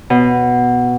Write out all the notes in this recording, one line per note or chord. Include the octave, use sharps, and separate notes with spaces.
B2